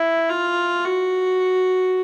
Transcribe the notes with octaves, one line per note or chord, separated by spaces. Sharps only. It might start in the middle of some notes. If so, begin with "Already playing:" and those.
Already playing: E4
F4
F#4